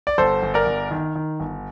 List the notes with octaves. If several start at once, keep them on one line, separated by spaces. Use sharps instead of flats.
D5
G1 A4 C5
G1
A#4 D5
G1
D#3
D#3
G1